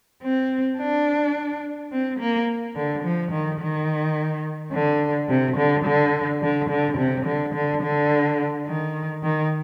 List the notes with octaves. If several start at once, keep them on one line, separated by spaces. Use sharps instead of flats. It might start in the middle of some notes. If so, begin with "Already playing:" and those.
C4
D4
C4
A#3
D3
F3
D#3
D#3
D3
C3
D3
D3
D3
D3
C3
D3
D3
D3
D#3
D#3